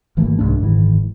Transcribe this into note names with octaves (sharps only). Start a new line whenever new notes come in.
G#1 E3 A3 A#3
C2 G#2 A3 D4
F#1 G#2 D#3 E3